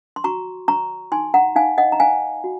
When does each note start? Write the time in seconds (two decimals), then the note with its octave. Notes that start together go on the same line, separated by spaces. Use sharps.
0.16 C6
0.24 F#4 A#5 C#6
0.68 C#5 A#5 C#6
1.12 D#4 G#5 C6
1.34 F#5 A#5
1.56 D#4 F5 G#5
1.78 D#5 F#5
1.92 A#5
2.00 C5 F5 G#5
2.44 F#4